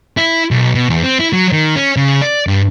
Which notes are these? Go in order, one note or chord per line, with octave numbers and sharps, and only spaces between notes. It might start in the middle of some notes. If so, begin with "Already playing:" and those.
E4
B1
B2
E2
C4
E4
F#3
D#3
C#4
C#3
D5
G2